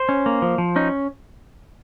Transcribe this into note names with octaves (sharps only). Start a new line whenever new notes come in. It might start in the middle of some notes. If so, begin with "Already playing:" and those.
Already playing: C5
C#4
A#3
F3
F3
C#4 D#4